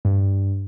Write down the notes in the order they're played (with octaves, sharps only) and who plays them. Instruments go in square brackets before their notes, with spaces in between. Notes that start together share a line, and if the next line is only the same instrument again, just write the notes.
[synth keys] G2